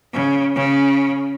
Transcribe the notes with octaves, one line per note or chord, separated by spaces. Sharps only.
C#3
C#3